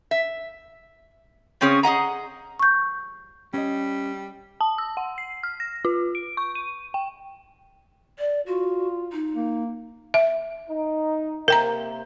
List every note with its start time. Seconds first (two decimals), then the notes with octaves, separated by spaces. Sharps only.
0.11 E5
1.61 C#3 C4 C#4 G#4 C#5
1.83 G#4 D#5 F#5 A#5
2.59 C#6 G6
3.54 G3 C#4 D#5
4.61 A5
4.78 E6
4.97 F#5
5.18 C7
5.43 F6
5.60 A#6
5.85 F4
6.15 D7
6.37 C#6
6.55 D#7
6.94 G5
8.19 D5
8.46 F4 F#4
9.13 D#4
9.34 A#3
10.14 E5
10.69 D#4
11.48 C3 A#3 A#4 G5 A#5